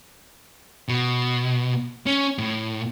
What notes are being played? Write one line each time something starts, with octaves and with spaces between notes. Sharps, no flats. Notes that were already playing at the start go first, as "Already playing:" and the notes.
B2
C#4
A2